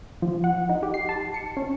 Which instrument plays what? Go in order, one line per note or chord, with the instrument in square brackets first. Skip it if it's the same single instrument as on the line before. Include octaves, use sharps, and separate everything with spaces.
[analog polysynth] F3
F#5
D#4
G4
C7
A5
C#7
C#4